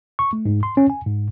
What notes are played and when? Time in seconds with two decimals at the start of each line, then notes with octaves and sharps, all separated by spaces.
0.19 C#6
0.33 A3
0.46 G#2
0.63 C6
0.77 C#4
0.90 G#5
1.06 G#2